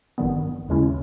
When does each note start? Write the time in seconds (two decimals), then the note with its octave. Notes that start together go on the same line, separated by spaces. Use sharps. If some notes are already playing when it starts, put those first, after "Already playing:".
0.18 G#1 G2 D#3 G3 B3
0.69 D#2 C#3 G#3 C#4 E4